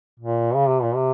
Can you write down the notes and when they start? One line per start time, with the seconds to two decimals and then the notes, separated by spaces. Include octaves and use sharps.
0.20 A#2
0.55 C#3
0.68 C3
0.83 A#2
0.96 C3